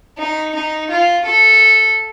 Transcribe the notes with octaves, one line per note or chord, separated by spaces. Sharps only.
D#4
D#4
F4
A4